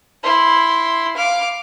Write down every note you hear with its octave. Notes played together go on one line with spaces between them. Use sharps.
E4 C6
F5 D6